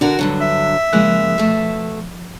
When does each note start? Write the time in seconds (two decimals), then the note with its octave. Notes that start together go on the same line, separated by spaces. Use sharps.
0.01 D3 D4 F#4 A#4
0.19 G2 D3 F#3
0.41 E5
0.93 C#3 F3 G#3 A#3 F#6
1.38 B2 A3